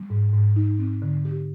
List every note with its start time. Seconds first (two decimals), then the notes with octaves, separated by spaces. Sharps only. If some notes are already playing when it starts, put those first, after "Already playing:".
Already playing: G3
0.10 G#2
0.33 G#2
0.56 D#4
0.79 C4
1.02 D3
1.25 G4